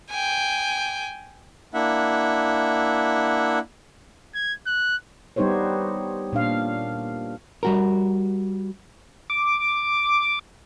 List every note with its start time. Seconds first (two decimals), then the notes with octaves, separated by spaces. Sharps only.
0.10 G5 G#5
1.74 A#3 D4 E4 E5 F#5
4.35 G#6
4.66 F#6
5.36 G3 B3 D#4 G4 C5 C#5
6.33 A#2 D4 F5
7.63 G3 F#4 A#4
9.30 D6